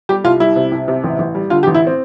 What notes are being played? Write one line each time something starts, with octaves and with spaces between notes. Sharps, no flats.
G3 G4
C2 F4
G3 E4
C3
C2
C3
A1
A1
G3
D3 F4
G4
A1
E4
C4